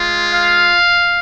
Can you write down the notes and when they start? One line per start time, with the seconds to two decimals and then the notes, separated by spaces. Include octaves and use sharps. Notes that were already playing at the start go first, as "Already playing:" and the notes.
Already playing: G#3 F4
0.32 F5